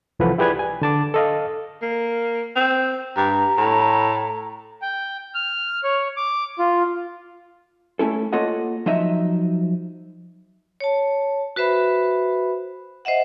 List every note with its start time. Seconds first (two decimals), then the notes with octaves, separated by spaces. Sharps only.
0.19 C2 E3 F3 A4 B4 F#5
0.38 E4 G4 G#4 B4 D5 G#6
0.59 G#5
0.82 D3 A5 D6
1.14 A4 D#5 F5
1.82 A#3
2.55 C4
3.17 G2 A#5
3.57 A2
4.82 G5
5.35 F6
5.84 C#5
6.17 D6
6.59 F4
7.99 A3 C#4 E4 A4
8.33 A#3 F4 A4 C#5 D#5 F#5
8.86 F3 F#3 D#4 D#5 E5
10.80 C#5 A5
11.56 F#4 B4 C5 E5 B5
13.05 C5 D#5 E5 F#5